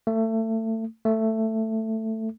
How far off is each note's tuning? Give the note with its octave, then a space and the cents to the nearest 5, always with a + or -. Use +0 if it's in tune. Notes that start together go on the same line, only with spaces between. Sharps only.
A3 +25
A3 +10